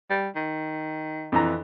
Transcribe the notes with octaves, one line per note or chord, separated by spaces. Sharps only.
G3
D#3
F2 E3 A#5